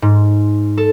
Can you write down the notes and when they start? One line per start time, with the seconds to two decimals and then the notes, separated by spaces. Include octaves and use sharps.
0.02 G#2
0.78 A4